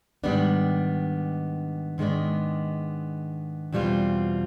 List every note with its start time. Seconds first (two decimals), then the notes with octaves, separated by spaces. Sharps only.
0.24 G#2 D#3 G3 B3 D4
1.98 G#2 D#3 G#3 B3 D4
3.72 E2 B2 G3 C4 F4